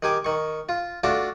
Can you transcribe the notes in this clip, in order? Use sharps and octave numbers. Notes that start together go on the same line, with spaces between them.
D#3 G4 G#5 D6
D#3 C#6
F4
A3 D4 F4 F#4 A5 D6